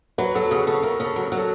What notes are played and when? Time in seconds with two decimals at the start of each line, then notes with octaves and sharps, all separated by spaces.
0.18 F#3 B4
0.35 F#3 A4
0.51 C#3 G#4
0.67 C#3 A4
0.83 C#3 A#4
1.00 C#3 A4
1.16 F#3
1.32 F#3
1.38 A4